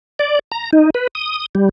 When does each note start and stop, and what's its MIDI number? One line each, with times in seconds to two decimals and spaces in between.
0.19 0.39 74
0.52 0.71 82
0.73 0.90 63
0.94 1.07 71
1.15 1.46 87
1.55 1.69 55